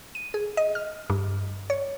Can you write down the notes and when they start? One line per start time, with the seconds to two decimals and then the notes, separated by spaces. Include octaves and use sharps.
0.15 D#7
0.34 G#4
0.57 D#5
0.75 F6
1.10 G2
1.70 C#5